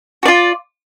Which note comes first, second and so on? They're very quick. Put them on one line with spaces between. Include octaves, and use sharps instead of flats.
F#4 D5 F4